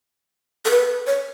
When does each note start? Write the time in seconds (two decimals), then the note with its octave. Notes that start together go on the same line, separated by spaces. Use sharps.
0.65 A4
0.70 B4
1.07 C#5